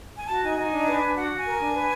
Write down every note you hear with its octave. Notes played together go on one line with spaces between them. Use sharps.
G#5
F#4 A5
D#4 G#5
D#4 G#5
D4
B4
D4
F#4 F#5
F#4
G#5
A#4
D4
B4